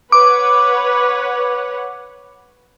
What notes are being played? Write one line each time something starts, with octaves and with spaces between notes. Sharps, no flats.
B4 C#5 F#5 D6